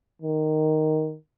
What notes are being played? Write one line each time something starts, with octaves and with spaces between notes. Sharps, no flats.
D#3